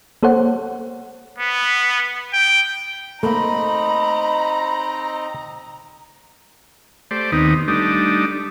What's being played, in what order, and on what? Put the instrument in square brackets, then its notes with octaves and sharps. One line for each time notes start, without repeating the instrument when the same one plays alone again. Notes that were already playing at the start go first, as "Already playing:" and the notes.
[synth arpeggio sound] A#3 A4 C5 C#5 F#5
[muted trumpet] B3
G5
[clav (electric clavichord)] A3 A#3 [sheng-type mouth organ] C4 D#4 D#5 [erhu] A#5 [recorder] B5
[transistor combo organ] A3 G4 C5 D5
D#2 D#3 B3 C4 D#4
G3 A3 D4 D#4